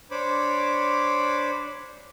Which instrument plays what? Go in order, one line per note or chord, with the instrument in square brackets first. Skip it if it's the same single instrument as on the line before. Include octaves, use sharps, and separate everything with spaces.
[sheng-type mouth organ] D4 C5 C#5 B5 D6